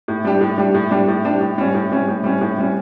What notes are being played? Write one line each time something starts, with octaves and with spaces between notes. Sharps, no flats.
A2
G3 D4 G4
A2
G3 D4 G4
A2
G3 D4 G4
A2
G3 D4 G4
A2
G3 C#4
A2
G3 C#4
A2
G3 C#4
A2
G3 C#4